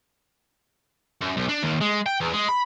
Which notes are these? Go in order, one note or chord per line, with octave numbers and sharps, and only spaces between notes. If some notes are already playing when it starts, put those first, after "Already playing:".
F#2
B1
D4
D#2
G#3
G5
E2
G#3
B5